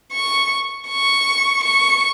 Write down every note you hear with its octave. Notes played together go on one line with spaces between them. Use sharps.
C#6
C#6
C#6